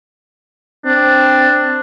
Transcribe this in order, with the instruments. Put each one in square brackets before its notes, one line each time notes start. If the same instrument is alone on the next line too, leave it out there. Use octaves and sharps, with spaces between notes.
[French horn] C4 [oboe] D4